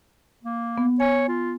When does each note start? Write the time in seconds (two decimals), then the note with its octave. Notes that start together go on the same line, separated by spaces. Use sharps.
0.44 A#3
0.78 B3
1.00 C#5 G#5
1.29 F4